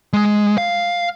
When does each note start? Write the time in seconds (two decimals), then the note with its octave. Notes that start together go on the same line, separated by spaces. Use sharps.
0.13 G#3
0.58 F5